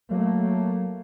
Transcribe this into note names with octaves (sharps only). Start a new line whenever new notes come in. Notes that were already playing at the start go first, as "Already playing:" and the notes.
F#3 A3 A#3